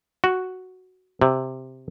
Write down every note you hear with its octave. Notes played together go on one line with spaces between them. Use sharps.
F#4
C3